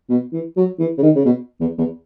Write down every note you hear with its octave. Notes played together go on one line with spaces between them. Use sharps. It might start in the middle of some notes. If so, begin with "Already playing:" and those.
B2
E3
F#3
E3
C#3
D#3
C#3
B2
E2
E2